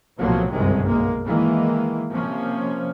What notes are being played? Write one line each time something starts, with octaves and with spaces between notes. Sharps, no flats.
B1 A2 C3 F3 F#3 A#3
G1 C2 F#2 C3 D#3 G#3
B1 G#3 A#3
D#3 E3 G#3 A#3
C3 F3 A#3 C#4